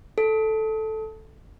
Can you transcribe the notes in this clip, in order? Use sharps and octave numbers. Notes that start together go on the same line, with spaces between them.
A4